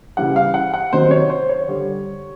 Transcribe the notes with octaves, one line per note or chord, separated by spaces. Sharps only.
C#3 E3 G3 F#5
F5
F#5
F#5
C3 D#3 F#3 C5
C#5
C5
C#5
D3 G3